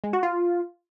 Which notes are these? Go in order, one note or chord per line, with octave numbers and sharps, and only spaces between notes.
G#3
F#4
F4